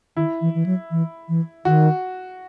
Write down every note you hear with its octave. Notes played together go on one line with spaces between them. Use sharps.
D#3 E4
E3
E3
F#3
E3
E3
D#3 F#4